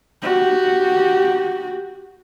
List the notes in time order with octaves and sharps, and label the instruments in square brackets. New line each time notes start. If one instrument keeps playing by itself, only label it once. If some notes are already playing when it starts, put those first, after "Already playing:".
[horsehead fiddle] F#4 G4